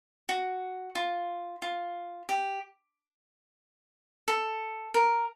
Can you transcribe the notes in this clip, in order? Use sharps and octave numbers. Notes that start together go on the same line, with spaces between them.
F#4
F4
F4
G4
A4
A#4